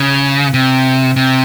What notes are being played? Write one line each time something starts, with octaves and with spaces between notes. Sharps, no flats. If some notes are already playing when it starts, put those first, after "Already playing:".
Already playing: C#3
C3
C3